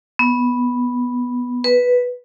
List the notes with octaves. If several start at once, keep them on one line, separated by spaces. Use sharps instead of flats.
B3
B4